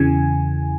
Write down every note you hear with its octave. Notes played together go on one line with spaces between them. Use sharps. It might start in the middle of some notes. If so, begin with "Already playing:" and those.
Already playing: E2 C#3 E3 G#5